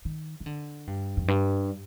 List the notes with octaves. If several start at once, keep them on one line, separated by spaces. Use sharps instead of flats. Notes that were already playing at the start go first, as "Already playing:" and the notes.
D#3
D#3
D3
G2
F2
G2